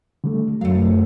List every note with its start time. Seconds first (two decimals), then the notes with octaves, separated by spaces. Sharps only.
0.24 D3 G3 A3
0.61 F#2 F#3 A3 F5